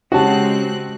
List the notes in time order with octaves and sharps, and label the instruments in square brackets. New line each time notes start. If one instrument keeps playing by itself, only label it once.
[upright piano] C#3 C#4 G4 [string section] G#3 C4 F#6 [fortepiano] F#4 A5